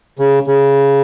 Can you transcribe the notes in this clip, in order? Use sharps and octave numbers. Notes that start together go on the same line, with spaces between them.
C#3
C#3